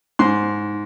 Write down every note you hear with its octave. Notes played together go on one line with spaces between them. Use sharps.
G#2 C6